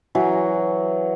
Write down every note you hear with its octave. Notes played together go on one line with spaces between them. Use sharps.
E3 F#3